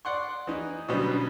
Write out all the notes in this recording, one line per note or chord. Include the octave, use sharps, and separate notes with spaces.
D5 F#5 C6 C#6
E3 D#4
B2 D3 F#3 G3 B3 C#4